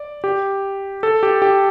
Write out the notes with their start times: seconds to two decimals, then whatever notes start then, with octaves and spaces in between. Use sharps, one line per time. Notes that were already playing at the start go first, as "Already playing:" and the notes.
Already playing: D5
0.24 G4
1.03 A4
1.23 G4
1.42 G4